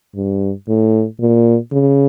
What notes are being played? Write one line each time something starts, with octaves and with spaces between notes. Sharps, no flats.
G2
A2
A#2
C#3